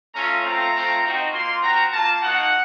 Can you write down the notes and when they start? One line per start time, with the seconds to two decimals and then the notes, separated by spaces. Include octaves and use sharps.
0.14 A3 C#4 F4 A#5
0.44 A3 C4 F4 A#5
0.73 A3 C4 F4
1.03 C4 D#4 F#4
1.33 A#3 F4 C6
1.62 C4 F#4 A#5
1.92 A#3 F4 A5
2.22 A#3 D#4 F#4 F#5